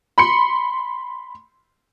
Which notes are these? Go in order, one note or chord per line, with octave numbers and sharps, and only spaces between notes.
B5 C6 C#7